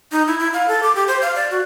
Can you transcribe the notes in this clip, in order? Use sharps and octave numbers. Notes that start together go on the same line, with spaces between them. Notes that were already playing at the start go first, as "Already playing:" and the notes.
D#4
E4
E4
F5
A4
D6
G4
C5
F5
D5
F#4